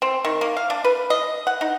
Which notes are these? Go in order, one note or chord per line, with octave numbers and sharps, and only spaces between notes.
C4
D#3
A#3
F5
D4
B4
D#5
F#5
D#4